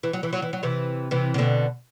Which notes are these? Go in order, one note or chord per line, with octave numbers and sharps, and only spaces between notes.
E3
F#3
E3
F#3
E3
F#3
C3 E3
C3 E3
C3
B2 D3